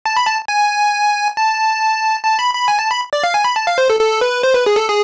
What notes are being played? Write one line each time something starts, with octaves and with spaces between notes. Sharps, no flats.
A5
B5
A5
G#5
A5
A5
B5
B5
G#5
A5
B5
D5
F5
G#5
B5
A5
F5
C5
A4
A4
B4
C5
B4
G#4
A4
G#4